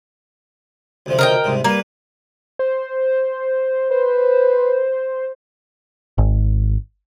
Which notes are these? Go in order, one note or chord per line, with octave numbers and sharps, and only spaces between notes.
D2 C3 F3
A#4 D#5 G5
C2 G#2 C3
G3 A#3 B4
C5
B4 C5
G#1